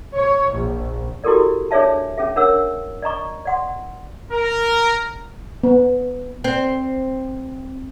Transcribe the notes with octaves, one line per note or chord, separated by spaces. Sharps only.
C#5
A#1
E4 F#4 G4 A4 A#4 D5
D4 G#4 C#5 D5 E5 A5
C#4 G#4 E5
D4 A#4 C#5 F#5 E6
D5 D#5 A#5 C#6
D5 F#5 C6
A#4
B3
C4